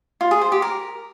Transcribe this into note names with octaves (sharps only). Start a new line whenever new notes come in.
F4
G#4
C5
G4
A#4